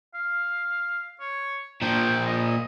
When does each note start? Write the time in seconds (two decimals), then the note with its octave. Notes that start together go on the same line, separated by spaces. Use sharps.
0.14 F5
1.20 C#5
1.82 A#2 F3 G5
2.26 D#5